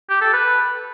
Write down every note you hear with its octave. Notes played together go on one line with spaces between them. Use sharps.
G4
A4
B4